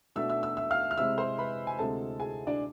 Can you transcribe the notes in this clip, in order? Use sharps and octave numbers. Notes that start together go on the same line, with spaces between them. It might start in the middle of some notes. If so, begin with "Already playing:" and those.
B2 A3 D4 E5 E6
E5 E6
E5 E6
E5 E6
F5 F6
F6
C3 G#3 C4 E4 E5 E6
C5 C6
B4 B5
G#5
D2 C3 G#3 C4 E4 A4 A5
G#4 G#5
D4 D5